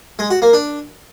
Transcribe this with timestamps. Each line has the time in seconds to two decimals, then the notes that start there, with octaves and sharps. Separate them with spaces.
0.19 G#3
0.30 F#4
0.42 A#3
0.53 D4